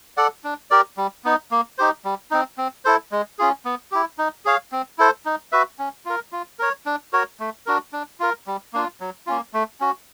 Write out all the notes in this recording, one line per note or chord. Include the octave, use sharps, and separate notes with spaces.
A4 D5 F#5
D4
G4 A#4 D5
G3
B3 D#4
A#3
D#4 G4 C5
G3
C4 D#4
C4
E4 A4 C5
G#3
C#4 F4 G#4
B3
E4 G4
D#4
G#4 C#5 F5
C4
E4 A4 C5
D#4
F#4 B4 E5
C#4
F4 A#4
F4
A#4 C#5
D4
F#4 A#4 C#5
A3
D4 F#4 A#4
D4
F4 A#4
G3
A#3 D4 F4
F#3
A#3 C#4 F4
A3
C#4 F#4